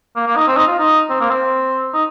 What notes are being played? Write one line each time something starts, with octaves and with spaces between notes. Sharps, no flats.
A#3
A#3
D#4
C4
D#4
F4
D#4
C4
A#3
C4
D#4